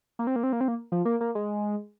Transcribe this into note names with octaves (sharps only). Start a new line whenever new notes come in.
A#3
C4
A#3
C4
A#3
C4
A#3
F3
A#3
A#3
G#3